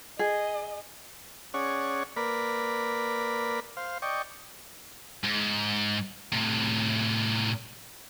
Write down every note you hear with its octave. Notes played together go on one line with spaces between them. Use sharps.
G#4 D#5
C#4 G#4 C#5 D5 F#5
A#3 A#4 B4 D5 B5
C5 F5
D5 D#5 G5 C#6
G#2
A2 C3